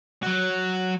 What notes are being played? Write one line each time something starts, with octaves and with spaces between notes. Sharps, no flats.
F#3 F#4